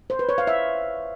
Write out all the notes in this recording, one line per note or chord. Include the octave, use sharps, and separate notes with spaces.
C5
B4
C#5
F5
E5